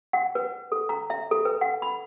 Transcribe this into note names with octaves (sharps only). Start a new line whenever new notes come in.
F#5
B4
A4
A#5
E5
A4
B4
F#5
B5